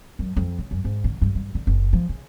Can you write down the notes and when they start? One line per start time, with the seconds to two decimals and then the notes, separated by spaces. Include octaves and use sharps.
0.19 F#2
0.37 F2
0.59 C#3
0.71 F#2
0.84 G#2
1.04 D3
1.21 G2
1.35 G2
1.55 D3
1.67 F#1
1.93 F3
2.09 C#3